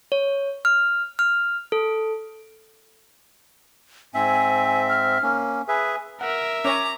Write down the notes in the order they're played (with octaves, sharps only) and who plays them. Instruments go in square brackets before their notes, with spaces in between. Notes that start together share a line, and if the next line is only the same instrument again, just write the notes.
[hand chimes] C#5
F6
F6
A4
[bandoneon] G#2 C4 E5 [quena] G#5
[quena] F6
[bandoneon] A#3 C#4
[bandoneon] G#4 B4 E5 [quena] G#5
[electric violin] A#4 E5 [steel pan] F#5
[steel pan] C#4 C#5 G#5 [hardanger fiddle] A#5 [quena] D6